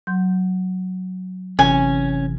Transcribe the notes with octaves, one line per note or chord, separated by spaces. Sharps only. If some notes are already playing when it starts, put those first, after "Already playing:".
F#3 C6 G6
G1 C3 E3 C#4 G#5